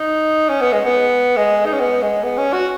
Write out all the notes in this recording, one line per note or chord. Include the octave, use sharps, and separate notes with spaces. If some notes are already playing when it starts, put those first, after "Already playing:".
Already playing: D#4
C#4
B3
G#3
B3
G#3
D#4
C#4
B3
G#3
B3
C#4
F#4